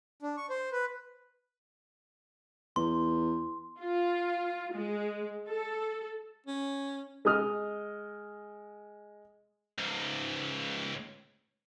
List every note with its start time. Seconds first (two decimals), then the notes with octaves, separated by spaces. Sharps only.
0.22 D4
0.37 C#6
0.50 C5
0.72 B4
2.76 E2 C6
3.80 F4
4.73 G#3
5.47 A4
6.46 C#4
7.25 G#3 D#5 D#6 F6
9.78 C#2 G#2